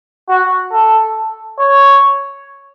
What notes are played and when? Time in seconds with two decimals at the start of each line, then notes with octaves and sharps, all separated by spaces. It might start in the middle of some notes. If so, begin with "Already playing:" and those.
0.29 F#4
0.72 A4
1.59 C#5